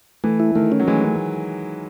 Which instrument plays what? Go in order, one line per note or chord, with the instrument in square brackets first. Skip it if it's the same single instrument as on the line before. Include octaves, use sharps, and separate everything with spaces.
[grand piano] E3 [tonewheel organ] A3
[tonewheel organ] E4
[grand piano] D#3 [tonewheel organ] A3
[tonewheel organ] C#4
[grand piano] F#3
[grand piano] E3 G#3 [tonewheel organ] A3